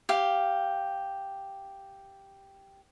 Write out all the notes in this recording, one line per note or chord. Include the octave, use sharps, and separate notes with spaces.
G4 F5